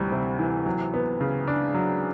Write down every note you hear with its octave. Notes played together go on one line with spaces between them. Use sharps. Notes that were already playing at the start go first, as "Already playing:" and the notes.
Already playing: D2 C3 E3 G3
C3
E3
F#3
B3
C#3
D4
F#3